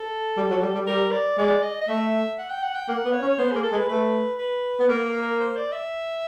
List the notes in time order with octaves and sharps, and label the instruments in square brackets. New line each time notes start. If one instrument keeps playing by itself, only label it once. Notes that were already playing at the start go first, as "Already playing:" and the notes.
Already playing: [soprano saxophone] A4
[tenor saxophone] G3
F#3
G3
G3
[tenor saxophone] G3 [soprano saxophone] A#4
[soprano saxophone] D5
[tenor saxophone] G#3 [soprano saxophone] D5
[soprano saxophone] D#5
D#5
[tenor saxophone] A3 [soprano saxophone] E5
[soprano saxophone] F#5
G5
F#5
G5
[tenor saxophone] A#3 [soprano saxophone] F#5
[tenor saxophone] B3
[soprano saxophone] C#5
[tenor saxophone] C#4
[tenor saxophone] B3 [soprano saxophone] C5
[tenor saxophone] A#3 [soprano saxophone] G#4
[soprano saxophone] A4
[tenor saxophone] G#3
[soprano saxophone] B4
[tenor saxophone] A3 [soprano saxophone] B4
[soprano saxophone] B4
[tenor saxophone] B3
[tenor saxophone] A#3 [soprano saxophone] A#4
[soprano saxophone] A#4
A#4
C5
D5
E5